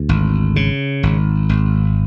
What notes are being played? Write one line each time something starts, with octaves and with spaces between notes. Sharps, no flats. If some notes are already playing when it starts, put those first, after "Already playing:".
Already playing: D2
G#1
C#3
G#1
G#1